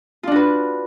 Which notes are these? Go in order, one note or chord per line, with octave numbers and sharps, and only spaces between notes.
D4 F4 F#4 B4